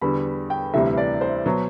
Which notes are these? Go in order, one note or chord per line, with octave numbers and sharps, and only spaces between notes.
E2 D3 G3 B5
G5
D2 C3 E3 G3 E5
E5
D5
C5
B2 F#3